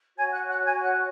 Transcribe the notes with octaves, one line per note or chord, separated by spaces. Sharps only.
F#4 C#5 G#5 G#6
F#5 F#6
F#5 F#6
G#5 G#6
F#5 F#6